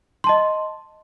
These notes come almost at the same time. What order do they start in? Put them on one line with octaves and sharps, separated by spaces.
C6 A5 D#5